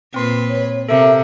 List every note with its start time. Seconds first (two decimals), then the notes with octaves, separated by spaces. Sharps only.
0.14 A#2 C4 B4 C6 C7
0.49 C#5
0.89 C3 A4 A#4 E5